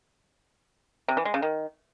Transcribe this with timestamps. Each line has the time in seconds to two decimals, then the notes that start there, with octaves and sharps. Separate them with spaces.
1.08 C3
1.17 E3
1.25 G#3
1.34 C#3
1.42 D#3